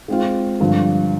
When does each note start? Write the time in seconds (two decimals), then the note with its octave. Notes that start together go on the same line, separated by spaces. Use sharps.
0.08 G#3 C4 F4
0.60 G2 D3 F3